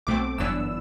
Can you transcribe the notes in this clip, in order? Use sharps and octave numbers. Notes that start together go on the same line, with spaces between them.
B1 B2 A3 C4 D6
G1 F#2 E3 B3 D4 E6